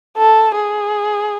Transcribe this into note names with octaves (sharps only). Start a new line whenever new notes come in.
A4
G#4